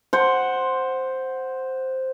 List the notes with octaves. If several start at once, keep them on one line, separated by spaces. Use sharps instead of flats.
C5 F#5